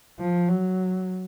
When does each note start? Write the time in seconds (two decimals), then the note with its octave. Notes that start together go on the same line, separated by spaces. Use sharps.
0.20 F3
0.49 F#3